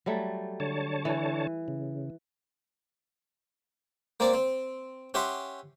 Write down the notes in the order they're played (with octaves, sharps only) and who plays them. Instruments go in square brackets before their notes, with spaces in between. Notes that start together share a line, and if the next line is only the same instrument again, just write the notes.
[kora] F#3 G3 A3
[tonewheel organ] D3 C#5 A5
[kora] E3
[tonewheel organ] C#3
[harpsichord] A#3 C4 D5
C4
C#4 G4 E5 F#5 C6